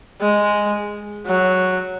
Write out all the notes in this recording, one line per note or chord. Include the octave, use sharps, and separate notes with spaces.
G#3
F#3